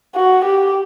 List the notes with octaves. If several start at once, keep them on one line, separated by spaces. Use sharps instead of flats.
F#4
G4